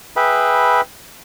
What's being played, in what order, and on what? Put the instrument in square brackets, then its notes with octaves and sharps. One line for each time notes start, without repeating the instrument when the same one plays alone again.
[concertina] G#4 B4 E5 G5 B5